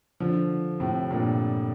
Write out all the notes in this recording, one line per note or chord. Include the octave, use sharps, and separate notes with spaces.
D3 F3
A2 C3
G2 A#2